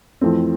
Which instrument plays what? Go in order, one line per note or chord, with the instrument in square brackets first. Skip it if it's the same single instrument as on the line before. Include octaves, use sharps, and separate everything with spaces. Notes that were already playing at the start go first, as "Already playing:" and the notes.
[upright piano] F2 E3 A3 C4